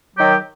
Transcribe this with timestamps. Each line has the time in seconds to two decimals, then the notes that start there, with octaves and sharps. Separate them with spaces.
0.15 F#3
0.18 G4
0.20 D#3